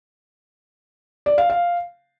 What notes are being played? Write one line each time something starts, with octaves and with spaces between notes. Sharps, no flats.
D5
F5
F5